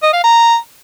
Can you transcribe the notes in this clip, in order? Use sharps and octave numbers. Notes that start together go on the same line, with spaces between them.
D#5
F5
A#5